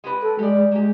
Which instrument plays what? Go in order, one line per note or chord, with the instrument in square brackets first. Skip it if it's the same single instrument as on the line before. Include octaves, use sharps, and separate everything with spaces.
[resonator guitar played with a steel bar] G#3 G4 B4
[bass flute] A4
[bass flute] G#3 [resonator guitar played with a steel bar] G4 D5
[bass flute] G#3 [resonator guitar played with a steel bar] A#3 G4